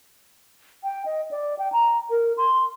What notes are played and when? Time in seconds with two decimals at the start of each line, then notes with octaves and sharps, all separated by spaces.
0.84 G5
1.06 D#5
1.31 D5
1.59 G5
1.72 A#5
2.10 A#4
2.38 C6